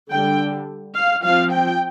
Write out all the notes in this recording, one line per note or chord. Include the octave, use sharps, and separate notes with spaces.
D3 G3 D4 G5
F5
F3 C4 F5
G5